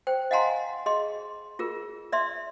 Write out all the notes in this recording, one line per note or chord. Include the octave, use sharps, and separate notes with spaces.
C5 G5
D#5 F5 F#5 G#5 A#5 C6
G#4 D#5 C6
F4 G#4 A#4
D5 E5 C6